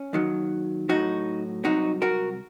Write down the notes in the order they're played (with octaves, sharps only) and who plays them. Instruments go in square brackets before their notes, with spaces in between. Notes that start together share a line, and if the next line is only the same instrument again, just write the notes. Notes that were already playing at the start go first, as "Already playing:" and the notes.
Already playing: [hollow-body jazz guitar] C#4
D#2 D#3 F#3
A2 F#3 D#4 F#4
C2 C3 F#3 D#4 F#4
F#4 A#4